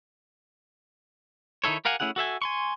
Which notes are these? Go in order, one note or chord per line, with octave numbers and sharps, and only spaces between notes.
D#3 D#4 E4 A4 C#5
G4 A#4 F5 F#5 G#5
A3 C#4 E4 G#4 F#5
F#4 A4 E5 G#5
G#5 C6 C#6